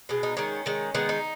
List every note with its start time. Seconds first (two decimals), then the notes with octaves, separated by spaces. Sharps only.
0.09 B2 G#3
0.23 D#4
0.37 D#3 G#3 C#4
0.66 D#3 G#3
0.94 D#3 G#3 B3
1.09 D#4